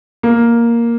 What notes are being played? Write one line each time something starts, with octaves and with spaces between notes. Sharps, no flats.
A#3